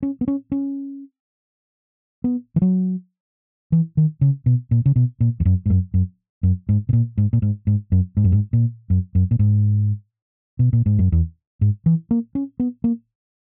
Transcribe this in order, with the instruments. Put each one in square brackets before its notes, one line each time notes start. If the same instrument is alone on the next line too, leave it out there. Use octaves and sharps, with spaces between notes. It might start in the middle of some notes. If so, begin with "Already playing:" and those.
[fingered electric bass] C#4
B3
C#4
C#4
B3
E3
F#3
E3
D#3
C#3
B2
A#2
C#3
B2
A#2
E2
F#2
G#2
F#2
F#2
F#2
G#2
B2
A#2
G#2
A#2
G#2
G#2
F#2
G#2
F#2
G#2
A#2
F#2
F#2
A#2
G#2
B2
A#2
G#2
F#2
E2
G#2
E3
A#3
C#4
B3
A#3